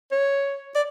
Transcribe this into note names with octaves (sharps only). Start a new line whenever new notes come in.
C#5
D5